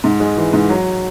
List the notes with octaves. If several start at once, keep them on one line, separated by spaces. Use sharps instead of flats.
G#2
G#3
E3
G#2
F#3